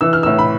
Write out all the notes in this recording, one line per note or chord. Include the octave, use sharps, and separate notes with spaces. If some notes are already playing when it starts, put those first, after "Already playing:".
E3 E6
F6
A2 E6
B5